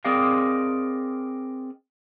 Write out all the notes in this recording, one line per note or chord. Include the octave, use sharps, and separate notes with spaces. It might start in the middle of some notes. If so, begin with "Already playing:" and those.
C4 G#4 A#4 D5 D#5 F5